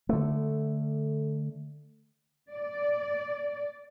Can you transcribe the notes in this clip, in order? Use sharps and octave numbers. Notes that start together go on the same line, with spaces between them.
D3 A3
D5